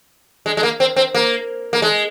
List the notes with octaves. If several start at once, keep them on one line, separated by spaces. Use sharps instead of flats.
G#3
G#3
A#3
C4
C4
A#3
A#3
G#3